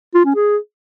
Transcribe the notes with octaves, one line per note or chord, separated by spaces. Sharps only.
F4
C#4
G#4